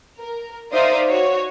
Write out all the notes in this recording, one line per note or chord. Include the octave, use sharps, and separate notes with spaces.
A#4
D#4 C5 D5 E5 F5 D#6
F#4 C#5